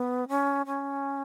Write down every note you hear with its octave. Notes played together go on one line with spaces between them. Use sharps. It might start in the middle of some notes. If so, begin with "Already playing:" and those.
Already playing: B3
C#4
C#4